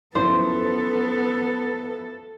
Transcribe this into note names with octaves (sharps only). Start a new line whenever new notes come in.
F#2 F3 B3 E4 A4 C5